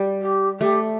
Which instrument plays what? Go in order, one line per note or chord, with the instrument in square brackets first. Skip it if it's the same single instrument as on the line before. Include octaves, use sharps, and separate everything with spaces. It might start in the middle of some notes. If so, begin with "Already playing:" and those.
Already playing: [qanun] G3
[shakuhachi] G4
[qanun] A3 [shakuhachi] G4